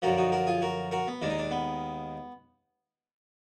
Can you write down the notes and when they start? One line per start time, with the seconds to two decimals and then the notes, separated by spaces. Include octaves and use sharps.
0.02 F#2 D3 F3 F#4 A#4
0.18 D#4 F#4
0.32 F#4 A#4
0.47 F4 G#4
0.62 F#4 A#4
0.91 F#4 A#4
1.07 B3
1.22 D#2 D#3 G#3 D4
1.30 D#4
1.39 D4
1.51 B3